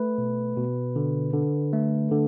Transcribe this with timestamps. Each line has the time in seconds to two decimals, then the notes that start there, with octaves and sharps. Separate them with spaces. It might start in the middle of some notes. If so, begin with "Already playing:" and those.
Already playing: A3 B4
0.18 B2
0.57 B2
0.96 D3
1.33 D3
1.73 A3
2.11 D3